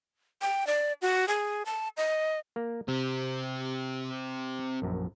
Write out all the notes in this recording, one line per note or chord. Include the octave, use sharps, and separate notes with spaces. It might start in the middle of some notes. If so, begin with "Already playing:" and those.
G5
D5
F#4
G#4
A5
D#5
A#3
C3 C4 G4
A#1 F#2